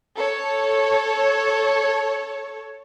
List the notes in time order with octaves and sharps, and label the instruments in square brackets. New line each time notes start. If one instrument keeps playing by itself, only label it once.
[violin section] A4 C#5